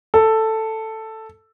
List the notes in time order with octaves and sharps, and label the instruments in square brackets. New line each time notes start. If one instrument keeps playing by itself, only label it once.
[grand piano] A4